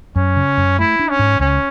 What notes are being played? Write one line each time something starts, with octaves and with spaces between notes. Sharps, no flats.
F#2 C#4
C#3
F#2
A3 E4
D4
C#4
G#2
C#2 C#4